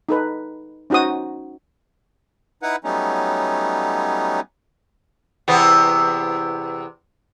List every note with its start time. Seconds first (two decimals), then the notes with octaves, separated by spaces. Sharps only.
0.09 D#4 A4 B4
0.90 C#4 D#4 F#4 C5 D#6
2.63 D#4 E4 B4 F#5
2.84 F#3 G3 A3 B3 C#4 D#4
5.48 E2 C3 B3